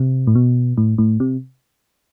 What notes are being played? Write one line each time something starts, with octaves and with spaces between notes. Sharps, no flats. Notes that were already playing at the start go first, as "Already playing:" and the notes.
Already playing: C3
A2
B2
A2
A2
C3